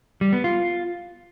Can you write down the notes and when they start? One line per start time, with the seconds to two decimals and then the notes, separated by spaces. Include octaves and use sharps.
0.21 G3
0.33 B3
0.44 F4